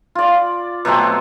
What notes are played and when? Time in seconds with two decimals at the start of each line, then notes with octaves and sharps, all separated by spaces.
0.15 F4 D5
0.85 B2 F#3 A3 C4